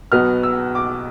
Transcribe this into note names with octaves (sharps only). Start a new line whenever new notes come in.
B1 B2 B3 F6
E6
D6